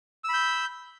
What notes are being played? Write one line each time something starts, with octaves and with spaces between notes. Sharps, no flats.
B5 E6 G6